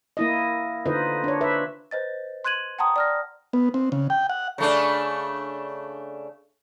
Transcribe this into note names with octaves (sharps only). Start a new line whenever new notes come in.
A#3 E4 D#5
D3 D#4 F4 B4 C5 D#5
D4 C#5
B4 C5 E5
B4 C5 D#5 A6
C6 F#6 G#6 D#7 F#7
F#5 G5 A5 A#5 C6 D#6
D5 F6 A#6
B3
C4
C#3
G5
F#5
C#3 A3 D4